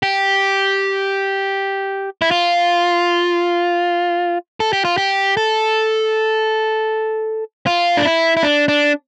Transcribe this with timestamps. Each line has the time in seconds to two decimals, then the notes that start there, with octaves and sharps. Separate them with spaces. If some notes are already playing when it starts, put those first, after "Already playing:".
0.03 G4
2.22 E4
2.31 F4
4.60 A4
4.73 G4
4.85 F4
4.97 G4
5.37 A4
7.67 F4
7.97 D4
8.05 E4
8.37 E4
8.43 D4
8.68 D4